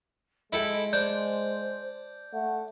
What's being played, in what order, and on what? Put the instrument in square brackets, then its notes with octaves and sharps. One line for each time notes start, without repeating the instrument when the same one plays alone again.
[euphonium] G#3 [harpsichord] E4 A4 G5 [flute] D#5
[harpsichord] D4 [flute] C5 [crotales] G6
[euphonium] A3 [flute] F#5